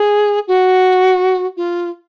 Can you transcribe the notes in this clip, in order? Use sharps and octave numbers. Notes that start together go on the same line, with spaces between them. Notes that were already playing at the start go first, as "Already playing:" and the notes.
Already playing: G#4
F#4
F4